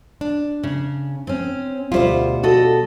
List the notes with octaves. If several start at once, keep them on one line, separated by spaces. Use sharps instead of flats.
D4
C#3
C4 C#4
D2 B2 G3 F4 C5
F#4 A4 D#5